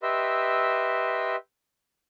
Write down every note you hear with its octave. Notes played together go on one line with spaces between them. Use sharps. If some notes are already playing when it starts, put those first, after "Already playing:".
G4 B4 D#5 E5 C6 E6